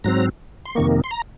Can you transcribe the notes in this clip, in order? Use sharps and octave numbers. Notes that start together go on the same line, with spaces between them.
G#2 F#3 C4 A#5
C6
F2 C3 D#3 A#3 C#6
C6
A#5